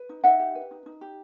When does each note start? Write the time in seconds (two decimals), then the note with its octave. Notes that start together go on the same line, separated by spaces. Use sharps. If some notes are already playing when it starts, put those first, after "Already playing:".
Already playing: B4
0.09 D#4
0.24 D#4 E5 F#5
0.39 G4
0.55 B4
0.71 D#4
0.86 D#4
1.01 G4